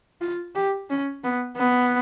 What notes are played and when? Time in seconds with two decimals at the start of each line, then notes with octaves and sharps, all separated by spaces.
0.21 F4
0.55 G4
0.90 C#4
1.24 B3
1.58 B3